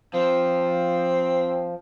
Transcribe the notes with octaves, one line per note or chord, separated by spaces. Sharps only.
F3 C4